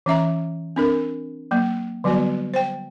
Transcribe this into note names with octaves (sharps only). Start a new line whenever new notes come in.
E3 C#4 E5 A#5
C4 D4 A#4
F#3 A#3
D3 F#3 G3 B3 F#4 D5
C5 G5